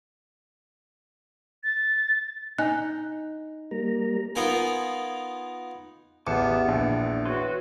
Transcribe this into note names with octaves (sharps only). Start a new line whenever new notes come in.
A6
D#4 G#5 F#6
G3 A#3 A#5
B3 D#4 F4 A#4 G#5
A1 E2 B3 G4 A5 D6 C#7
A#1 D4
F#4 B4 C#5 C6